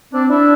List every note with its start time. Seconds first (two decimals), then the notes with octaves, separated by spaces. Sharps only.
0.13 C4 D4
0.28 D4 E4